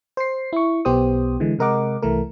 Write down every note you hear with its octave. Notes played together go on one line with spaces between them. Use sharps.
C5 C7
E4 C#6
B1 B3 G4 C5 D#6
D3 E3 G#3
C3 G#3 A#4 D#5 F#5 D6
C2 E3 A3 A#4